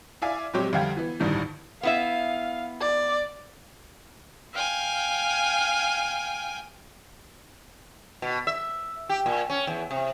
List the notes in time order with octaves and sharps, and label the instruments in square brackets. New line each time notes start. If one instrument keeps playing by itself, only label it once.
[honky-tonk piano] E4 D5 E5 F5 G#5 D6
A#1 F#3 G#3 C4 G4 C#5
F2 D3 G3 F5 G5 G#6
E3 B3
A1 D2 G2 D#3 E3
[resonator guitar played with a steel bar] B3 E4 E5 [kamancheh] F5
[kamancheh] D5
[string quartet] F5 G5 G#5
[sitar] B2
E5
G4
A#2
C#4
E2
C3